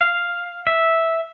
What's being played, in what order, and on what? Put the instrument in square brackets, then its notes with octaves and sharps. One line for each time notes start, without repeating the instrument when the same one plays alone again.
[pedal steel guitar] F5
E5